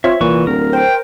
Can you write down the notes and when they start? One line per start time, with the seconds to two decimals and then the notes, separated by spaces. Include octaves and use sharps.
0.04 C4 F4 C#5 E5
0.21 C2 A#2 E3 B4 C#6
0.47 D1 A#4
0.73 C5 G5